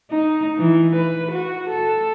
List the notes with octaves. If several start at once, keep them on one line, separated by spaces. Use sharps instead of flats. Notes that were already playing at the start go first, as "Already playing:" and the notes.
D#4
E3
B4
F#4
A4